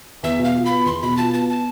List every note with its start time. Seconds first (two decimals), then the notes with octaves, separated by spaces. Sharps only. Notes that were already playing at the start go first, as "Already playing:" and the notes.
0.23 E2 E5
0.39 B2
0.44 F5
0.55 F4
0.66 B3 B5
0.86 E2 C6
1.02 B2 B5
1.17 F4 A5
1.33 B3 A5
1.49 A5